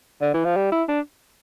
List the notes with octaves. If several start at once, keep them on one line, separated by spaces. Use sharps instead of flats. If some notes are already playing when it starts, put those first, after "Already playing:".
D3
E3
F3
G3
E4
D4